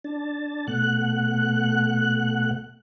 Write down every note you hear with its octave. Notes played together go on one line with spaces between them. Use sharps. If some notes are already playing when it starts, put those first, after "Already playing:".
D4 A5
B2 A3 F#5 F#6